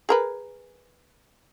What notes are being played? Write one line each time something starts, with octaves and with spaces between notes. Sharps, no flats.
G#4 A#4 B4